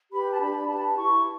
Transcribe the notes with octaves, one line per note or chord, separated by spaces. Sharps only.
G4 B4 B5
A5
D4 B5
G4 B4 A5
E4 C#6